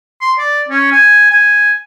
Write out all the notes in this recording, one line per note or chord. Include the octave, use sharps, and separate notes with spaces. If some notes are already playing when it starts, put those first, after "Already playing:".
C6
D5
C#4
G#5
G#5